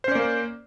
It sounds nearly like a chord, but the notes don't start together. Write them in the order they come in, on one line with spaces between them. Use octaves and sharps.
C5 C#4 D5 A#3